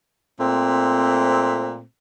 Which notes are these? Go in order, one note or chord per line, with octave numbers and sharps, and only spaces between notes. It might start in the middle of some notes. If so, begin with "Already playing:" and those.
A#2 A3 C4